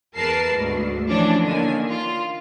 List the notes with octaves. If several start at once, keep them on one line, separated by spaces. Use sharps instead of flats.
E2 A#4 B4 A5 C7
D2 G#2
E3 F3 C#4 D4
D3 D#3 A#3 G#5
F4